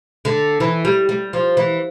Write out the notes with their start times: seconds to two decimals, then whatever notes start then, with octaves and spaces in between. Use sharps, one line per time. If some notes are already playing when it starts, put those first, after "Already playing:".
0.25 D3
0.60 E3
0.85 G3
1.09 G3
1.33 F3
1.57 E3